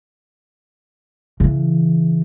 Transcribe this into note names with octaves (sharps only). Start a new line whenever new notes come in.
C#3 E3